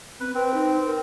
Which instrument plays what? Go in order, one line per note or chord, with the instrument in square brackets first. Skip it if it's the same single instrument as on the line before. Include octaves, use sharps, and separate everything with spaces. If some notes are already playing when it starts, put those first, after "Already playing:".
[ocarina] C4 [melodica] B4
[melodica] C4 [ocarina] B4
[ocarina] D#4
A#4